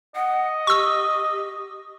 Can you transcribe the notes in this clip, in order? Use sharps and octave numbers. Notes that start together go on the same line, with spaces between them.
D#5 F#5
G4 C#6 E6